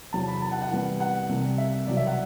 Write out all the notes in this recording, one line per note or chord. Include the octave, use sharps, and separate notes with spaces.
E2 C3 F#3 C4 E4 A5
B5
A5
F#5
F#5
C3 E3 G3 B3 E4
F#5
C2 C3 G3
E5
C2 B2 F#3 D5
E5
F#5